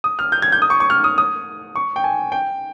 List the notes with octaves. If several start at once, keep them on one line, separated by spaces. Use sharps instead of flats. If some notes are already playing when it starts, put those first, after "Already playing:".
D#6
F6
G6
G#6
G6
D#6
C#6
C#6
F6
D#6
D#6
C#6
G5
G#5
G5